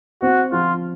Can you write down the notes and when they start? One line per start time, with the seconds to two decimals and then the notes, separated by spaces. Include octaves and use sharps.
0.22 C4 F#4
0.52 F3 F4